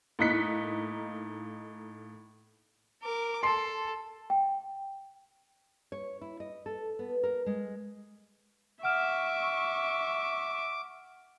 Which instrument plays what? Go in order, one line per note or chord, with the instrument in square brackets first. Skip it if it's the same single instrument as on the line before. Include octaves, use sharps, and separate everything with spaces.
[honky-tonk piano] A2 A#3 D#4 F#6 B6 C#7
[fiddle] A#4 D6
[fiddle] A4 [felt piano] C6 C7
[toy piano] G5
[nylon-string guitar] C#5
E4
D#5
A4
B3
A#4
G#3
[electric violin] E5 C#6 [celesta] F#5 F6 E7 [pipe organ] D6